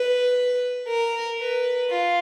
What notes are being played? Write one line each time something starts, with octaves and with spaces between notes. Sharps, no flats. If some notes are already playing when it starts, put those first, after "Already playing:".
Already playing: B4
A#4
B4
F4